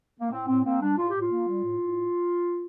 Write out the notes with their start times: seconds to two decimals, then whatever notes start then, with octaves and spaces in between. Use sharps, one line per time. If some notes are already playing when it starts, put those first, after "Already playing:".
0.20 A#3
0.31 A2 C4
0.48 A2 C4
0.65 A#3 C4
0.81 G3 D4
0.98 A2 F4
1.09 A2 G4
1.20 F4
1.31 A#3
1.47 G3
1.63 A2
1.80 A2